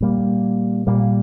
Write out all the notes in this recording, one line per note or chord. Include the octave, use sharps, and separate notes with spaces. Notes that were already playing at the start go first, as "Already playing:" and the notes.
A#2 G3 A#3
A#2 G3 A#3